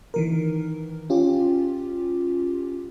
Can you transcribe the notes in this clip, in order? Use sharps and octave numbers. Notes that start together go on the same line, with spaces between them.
D#3 E3 A#4
C#4 F4 G4